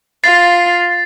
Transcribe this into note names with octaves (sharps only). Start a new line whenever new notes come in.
F4 A6 C7